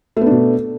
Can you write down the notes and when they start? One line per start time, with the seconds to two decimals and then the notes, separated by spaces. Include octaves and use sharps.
0.17 A3
0.21 B3
0.26 D4
0.31 B2